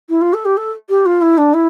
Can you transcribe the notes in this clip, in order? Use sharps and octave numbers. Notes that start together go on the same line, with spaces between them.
E4
F4
A4
G4
A4
G4
F4
E4
D4
E4